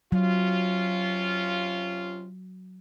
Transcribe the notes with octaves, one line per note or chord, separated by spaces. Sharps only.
C3 F#3 C#4 F4